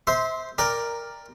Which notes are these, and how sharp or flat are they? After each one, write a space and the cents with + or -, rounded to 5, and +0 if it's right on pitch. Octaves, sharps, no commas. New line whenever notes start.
C5 -10 E5 -30 C6 +0
A#4 +0 D5 +0 G5 +25